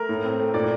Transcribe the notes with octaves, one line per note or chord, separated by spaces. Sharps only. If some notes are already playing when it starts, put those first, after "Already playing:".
Already playing: A3 A#4
A2
C4
A3
A#2 D5